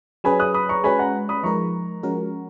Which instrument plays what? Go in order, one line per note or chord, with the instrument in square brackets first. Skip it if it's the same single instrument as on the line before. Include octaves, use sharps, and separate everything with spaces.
[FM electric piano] F#3 C#4 G#4 B4 [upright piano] G#5 B5
[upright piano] D#6 F#6
B5 D#6
A#5 C#6
[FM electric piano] G#3 C#4 F#4 B4 [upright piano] G#5 B5
[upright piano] F#5 A#5
B5 D#6
[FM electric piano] F3 G#3 D#4 A#4 [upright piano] A#5 C#6
[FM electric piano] F3 G#3 C#4 F#4 A#4